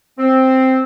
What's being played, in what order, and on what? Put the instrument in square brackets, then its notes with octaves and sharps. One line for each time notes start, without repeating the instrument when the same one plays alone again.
[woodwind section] C4